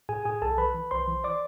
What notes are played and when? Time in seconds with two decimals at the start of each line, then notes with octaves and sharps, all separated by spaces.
0.09 A2 G#4 G#5
0.25 A2 G#4 G#5
0.42 B1 A4 A5
0.58 E3 B4 B5
0.75 E3
0.91 B1 C5 C6
1.08 E3
1.24 D5 D6